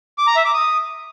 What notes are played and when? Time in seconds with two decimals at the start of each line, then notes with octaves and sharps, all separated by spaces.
0.18 D6
0.27 A#5
0.36 E5
0.45 D6
0.54 D#6